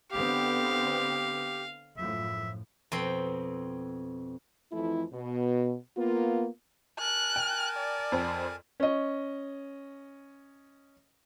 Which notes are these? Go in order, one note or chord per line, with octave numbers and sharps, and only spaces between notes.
D3 B3 C4 G4 F5
F#2 A2 F3 E5
F2 B2 C4 G5 C6
F2 E3 F3 A3 E4
B2
A#3 B3 F4
A#4 G#5 A5 F#6
G5
D5
F2 C4
C#4 D#5